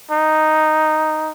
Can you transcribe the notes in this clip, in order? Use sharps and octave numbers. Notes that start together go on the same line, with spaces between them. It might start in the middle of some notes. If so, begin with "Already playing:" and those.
D#4